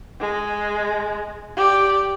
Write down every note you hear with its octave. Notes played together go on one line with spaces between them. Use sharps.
G#3
G4 D5